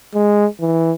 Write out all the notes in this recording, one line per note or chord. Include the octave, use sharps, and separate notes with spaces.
G#3
E3